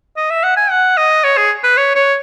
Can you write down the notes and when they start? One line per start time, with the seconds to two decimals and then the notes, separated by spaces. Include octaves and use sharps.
0.17 D#5
0.30 E5
0.44 F#5
0.57 G#5
0.71 F#5
0.97 D#5
1.24 C#5
1.37 G#4
1.64 B4
1.78 C#5
1.95 C#5